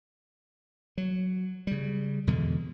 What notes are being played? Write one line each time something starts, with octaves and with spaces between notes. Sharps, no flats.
F#3
C#3 G3
E2 B2 D3 G#3